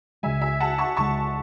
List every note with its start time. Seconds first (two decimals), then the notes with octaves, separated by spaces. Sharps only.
0.23 C#2 C#3 G#3 E5 G#5
0.41 E5 G#5
0.60 F#5 A5
0.78 A5 C#6
0.97 C#2 C#3 G#3 A5 C#6